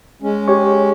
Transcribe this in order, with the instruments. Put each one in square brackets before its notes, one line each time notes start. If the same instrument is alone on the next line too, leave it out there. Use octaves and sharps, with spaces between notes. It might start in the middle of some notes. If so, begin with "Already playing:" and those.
[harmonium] G#3 C#4
[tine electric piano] G4 C#5 C#6